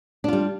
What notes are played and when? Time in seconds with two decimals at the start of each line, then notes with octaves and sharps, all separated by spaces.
0.24 D4
0.28 F4
0.33 G3